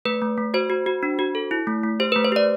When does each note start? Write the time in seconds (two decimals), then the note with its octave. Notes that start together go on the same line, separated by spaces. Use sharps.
0.05 A3 B4
0.22 A3
0.38 A3
0.54 F#4 C5
0.70 F#4
0.86 F#4
1.03 D4
1.19 F#4
1.35 A4
1.51 E4
1.67 A3
1.84 A3
2.00 G4 C5
2.12 B4
2.16 A3
2.24 C5
2.32 G4 D5